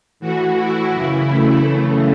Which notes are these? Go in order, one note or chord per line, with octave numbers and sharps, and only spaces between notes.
A2 E3 F#4
E4
F#2 C#3 E3
A3
F#2 C#3 E3